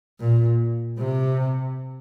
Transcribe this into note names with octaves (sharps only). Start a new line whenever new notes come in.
A#2
C3